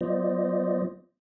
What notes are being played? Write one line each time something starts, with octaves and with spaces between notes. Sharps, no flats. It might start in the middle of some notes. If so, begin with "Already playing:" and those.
F#3 B3 F4 C5 D5 D#5